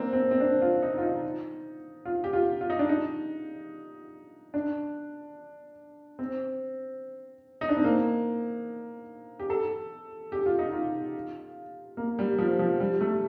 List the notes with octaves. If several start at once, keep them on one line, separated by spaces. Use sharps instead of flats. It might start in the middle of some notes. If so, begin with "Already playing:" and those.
Already playing: A#3 C4 D4
C4
C4
D4
F4
D#4
F4
D#4
F4
G4
F4
F4
D#4
D4
D#4
D4
C4
D#4
D4
C4
A#3
G4
A4
G4
F4
D#4
F4
A#3
G3
F3
F3
G3
A3